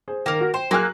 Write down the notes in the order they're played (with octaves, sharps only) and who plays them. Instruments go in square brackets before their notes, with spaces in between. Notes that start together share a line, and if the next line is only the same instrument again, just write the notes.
[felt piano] G#4 C5
[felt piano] D#3 [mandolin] A#3 A#4
[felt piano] F#4
[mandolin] C5 [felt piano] G5
[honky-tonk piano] F#3 G#4 F#6 [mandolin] A#3 F6 [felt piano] C6